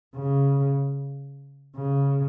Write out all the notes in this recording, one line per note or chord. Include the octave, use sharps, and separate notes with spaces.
C#3
C#3